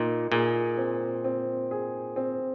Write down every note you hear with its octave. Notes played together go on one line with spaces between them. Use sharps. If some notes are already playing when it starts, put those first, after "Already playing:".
Already playing: A#2 D#4
A#2 G#4
C4
C4
G#4
C4